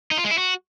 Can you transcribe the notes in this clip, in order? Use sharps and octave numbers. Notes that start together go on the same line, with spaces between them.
D#4
F4
G#3
E4
F#4